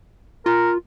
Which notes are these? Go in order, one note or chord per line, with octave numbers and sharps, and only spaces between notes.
F4 A#4